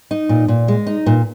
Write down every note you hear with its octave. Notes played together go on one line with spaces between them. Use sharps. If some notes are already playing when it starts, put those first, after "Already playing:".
D#4
A#2
A#2
G#3
D#4
A#2